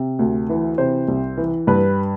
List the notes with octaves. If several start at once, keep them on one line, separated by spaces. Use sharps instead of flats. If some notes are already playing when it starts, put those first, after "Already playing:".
Already playing: C3
D2
E3
C3 C5
C2
E3
G2 B4